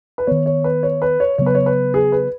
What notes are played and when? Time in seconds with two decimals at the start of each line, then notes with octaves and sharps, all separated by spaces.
0.18 B4
0.27 D#3 B3 C#5
0.46 C#5
0.64 B4
0.83 C#5
1.02 B4
1.20 C#5
1.38 C#3 F#3 B3 C#5
1.46 B4
1.55 C#5
1.66 B4
1.94 G#4
2.12 B4